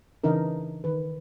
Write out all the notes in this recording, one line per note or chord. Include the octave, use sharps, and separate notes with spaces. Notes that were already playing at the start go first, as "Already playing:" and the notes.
C#3 E3 D4 D#4 A#4
D#3 B4